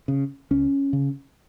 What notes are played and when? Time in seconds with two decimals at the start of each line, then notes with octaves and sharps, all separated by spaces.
0.08 C#3
0.51 C#2 C#4
0.93 C#3